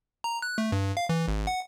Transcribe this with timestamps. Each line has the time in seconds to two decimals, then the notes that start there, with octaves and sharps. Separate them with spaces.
0.24 A#5
0.42 F#6
0.58 A3
0.72 G2
0.97 F5
1.09 E3
1.28 G#1
1.47 F#5